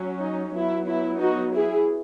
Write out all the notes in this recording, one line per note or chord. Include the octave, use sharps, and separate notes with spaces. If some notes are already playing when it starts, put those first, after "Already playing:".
Already playing: F#3 C#4
D#4
F#3 B3 E4
E4
D#4 F#4
E4 G#4